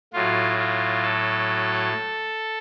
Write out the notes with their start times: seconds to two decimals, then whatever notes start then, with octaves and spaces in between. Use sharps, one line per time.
0.13 A2 F#3 F4
0.58 F4
1.03 A4